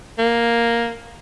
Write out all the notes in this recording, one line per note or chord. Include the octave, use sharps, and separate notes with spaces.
A#3